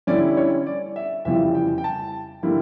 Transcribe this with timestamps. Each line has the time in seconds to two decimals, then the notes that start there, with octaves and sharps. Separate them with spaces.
0.07 D3 G3 C#4 E4 D5
0.37 C#5
0.67 D5
0.96 E5
1.25 F2 C#3 E3 G3 E5
1.55 G5
1.78 G5
1.84 A5
2.43 D3 G3 A#3 E4